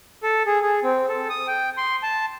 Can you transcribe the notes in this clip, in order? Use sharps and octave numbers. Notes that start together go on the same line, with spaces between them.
A4
G#4
G#4
C4
A4
D#6
G5
C6
A5